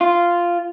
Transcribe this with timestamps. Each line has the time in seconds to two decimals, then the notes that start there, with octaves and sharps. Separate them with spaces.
0.01 F4